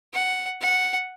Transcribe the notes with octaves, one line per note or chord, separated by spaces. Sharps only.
F#5
F#5